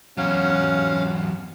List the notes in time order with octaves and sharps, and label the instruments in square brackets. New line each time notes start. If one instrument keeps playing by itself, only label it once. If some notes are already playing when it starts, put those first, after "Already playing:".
[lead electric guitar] E2 F#3 [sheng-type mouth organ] C#4 F5 F#5